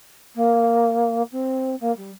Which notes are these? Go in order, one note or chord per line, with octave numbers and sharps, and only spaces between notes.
A#3
C4
A#3
G3